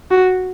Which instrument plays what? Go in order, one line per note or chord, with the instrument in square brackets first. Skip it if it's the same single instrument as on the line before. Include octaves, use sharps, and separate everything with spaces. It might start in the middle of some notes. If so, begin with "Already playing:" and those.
[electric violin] F#4